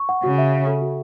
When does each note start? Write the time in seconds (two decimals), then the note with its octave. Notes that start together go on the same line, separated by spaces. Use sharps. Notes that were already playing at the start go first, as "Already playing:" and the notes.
Already playing: C#6
0.09 F#5
0.23 C#3 F#4
0.38 E5
0.52 E5
0.67 A4
0.82 F#4